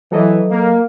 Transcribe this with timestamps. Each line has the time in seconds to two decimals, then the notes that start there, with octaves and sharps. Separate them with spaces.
0.12 E3 F#3 A4 D#5
0.50 A#3